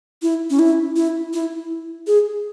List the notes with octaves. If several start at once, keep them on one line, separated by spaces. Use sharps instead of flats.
E4
C#4
E4
E4
E4
G#4